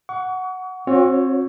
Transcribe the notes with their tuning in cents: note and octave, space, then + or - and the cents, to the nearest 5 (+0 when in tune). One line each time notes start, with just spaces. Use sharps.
F#5 +0 C#6 +35
C4 +30 F#4 -35 C#5 +10